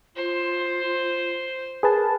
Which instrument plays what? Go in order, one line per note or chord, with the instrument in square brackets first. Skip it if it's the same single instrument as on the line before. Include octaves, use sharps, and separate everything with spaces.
[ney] F4 [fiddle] C5
[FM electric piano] G#4 B4 A5 [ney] A#4